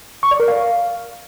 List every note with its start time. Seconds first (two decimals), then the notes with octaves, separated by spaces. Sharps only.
0.23 C#6
0.31 D5
0.40 A#4
0.48 F5